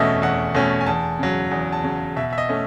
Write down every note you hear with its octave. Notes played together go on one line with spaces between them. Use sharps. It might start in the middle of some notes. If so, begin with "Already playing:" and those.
Already playing: E2 B2 A3 C#4 D#5 E5
E2 F#5
B2 A3 C#4
G#5
E2 A5
C#3 F#3
E2
A5
C#3 F#3
B2 E5
E5
D#5
A3 C#4